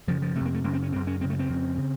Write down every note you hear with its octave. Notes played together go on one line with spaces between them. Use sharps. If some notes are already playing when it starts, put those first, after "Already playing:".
F#2 C#3 F3
F3
F2 C3 A3
A#3
A3
F#2 C#3 A#3
C4
C#4
F#2 C#3 C4
C#4
F#2 C#3 C4
A3
C4
F2 C#3
C#3